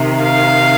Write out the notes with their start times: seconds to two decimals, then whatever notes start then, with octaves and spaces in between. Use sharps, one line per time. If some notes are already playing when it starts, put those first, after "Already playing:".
Already playing: C3 D#3
0.21 F5